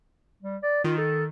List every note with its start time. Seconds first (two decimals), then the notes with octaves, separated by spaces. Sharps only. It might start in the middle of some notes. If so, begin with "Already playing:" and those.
0.43 G3
0.63 D5
0.84 D#3 F4
0.98 A4